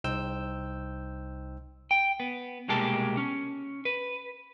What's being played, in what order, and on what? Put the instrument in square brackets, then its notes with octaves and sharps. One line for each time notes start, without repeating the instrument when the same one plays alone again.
[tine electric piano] C2 D#4 C5 G5 E6 G6
[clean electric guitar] G5
B3
C2 B2 G#3 A#3 G4 A5
C#4
B4